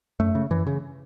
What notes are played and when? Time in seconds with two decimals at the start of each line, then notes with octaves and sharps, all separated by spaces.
0.20 F#2 A3
0.35 C#3
0.50 F#2 E3
0.67 C#3